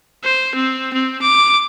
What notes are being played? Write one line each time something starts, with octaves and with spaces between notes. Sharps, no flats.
C5
C4
C4
D6